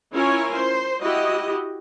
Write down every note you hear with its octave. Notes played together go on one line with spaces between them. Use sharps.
C#4 E4 F4 A#4 C#5 G#5
C5
E4 F#4 G4 D#5